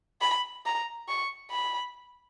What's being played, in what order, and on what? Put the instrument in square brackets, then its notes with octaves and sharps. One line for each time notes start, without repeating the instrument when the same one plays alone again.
[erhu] B5
A#5
C#6
B5